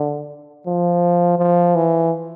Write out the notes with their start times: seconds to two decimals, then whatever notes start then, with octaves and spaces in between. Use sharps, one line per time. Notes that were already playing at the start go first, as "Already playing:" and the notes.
Already playing: D3
0.67 F3
1.39 F3
1.75 E3